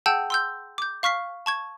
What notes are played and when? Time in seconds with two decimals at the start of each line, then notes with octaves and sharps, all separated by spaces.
0.06 G#4 F#5 G5 A5 E6 G6
0.30 C6 E6 G6
0.78 D6 G6
1.03 F5 C#6 F6 B6 C7
1.46 A5 C#6 G#6